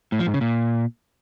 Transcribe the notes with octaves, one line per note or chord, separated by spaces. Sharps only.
A2
F3
G#2
C#3
A#2